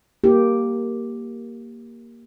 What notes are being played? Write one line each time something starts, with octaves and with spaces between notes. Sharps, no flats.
A#3 G4